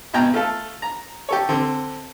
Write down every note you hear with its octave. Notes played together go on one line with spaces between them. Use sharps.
G#1 B2 G5 G#5 A#5
A3 F4 A4
A#5
G4 A4 C#5
D3 C4